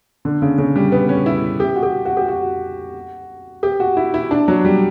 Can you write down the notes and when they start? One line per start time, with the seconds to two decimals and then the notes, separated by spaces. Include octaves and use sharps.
0.25 D3
0.42 C#3
0.58 C#3
0.76 G3
0.92 B3
1.09 C#4
1.26 E4
1.60 G4
1.76 F#4
1.83 G4
2.05 F#4
2.17 G4
2.28 F#4
3.63 G4
3.80 F#4
3.97 E4
4.14 E4
4.31 D4
4.48 F#3
4.65 G3